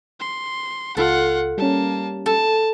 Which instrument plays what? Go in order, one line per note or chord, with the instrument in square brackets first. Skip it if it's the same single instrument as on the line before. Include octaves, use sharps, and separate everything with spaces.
[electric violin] C6
[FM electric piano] C#2 [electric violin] F4 F#5 [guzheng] A4
[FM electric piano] G3 C#4 [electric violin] A#3 A5
[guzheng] A4 [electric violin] A5